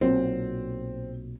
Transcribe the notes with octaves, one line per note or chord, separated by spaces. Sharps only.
B1 A#2 F#3 C4